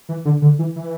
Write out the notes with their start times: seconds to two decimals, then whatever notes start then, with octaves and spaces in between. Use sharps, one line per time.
0.09 E3
0.25 D3
0.42 D3
0.59 E3
0.76 E3